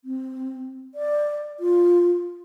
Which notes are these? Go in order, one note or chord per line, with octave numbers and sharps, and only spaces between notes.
C4
D5
F4